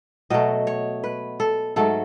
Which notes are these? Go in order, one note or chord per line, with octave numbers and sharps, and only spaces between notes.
B2 F#3 A3 D#5
C#5
B4
A4
G#2 F#3 A3 A4